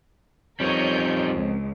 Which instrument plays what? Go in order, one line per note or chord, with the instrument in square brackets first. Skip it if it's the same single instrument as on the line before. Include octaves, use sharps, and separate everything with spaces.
[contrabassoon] F2 [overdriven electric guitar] G3 D#4 [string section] A#4 C#5 G6
[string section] C#2